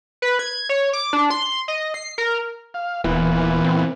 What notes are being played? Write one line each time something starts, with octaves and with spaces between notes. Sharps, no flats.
B4
G#6
C#5
D6
D4
C6
D#5
C7
A#4
F5
D#1 A#2 E3 B3
C4